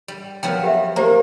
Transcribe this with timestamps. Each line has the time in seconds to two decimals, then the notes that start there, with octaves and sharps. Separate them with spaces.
0.08 G3
0.43 F3 F#3 B3 G5
0.63 G4 B4 E5
0.96 A#3 G4 C5 A#5